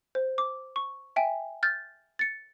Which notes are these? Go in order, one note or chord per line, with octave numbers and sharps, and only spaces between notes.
C5
D6
C#6
E5 G5 G#5
F6 G6 A6
A6 C#7